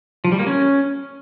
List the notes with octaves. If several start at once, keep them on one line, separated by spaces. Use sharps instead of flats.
F3
G3
A#3
C#4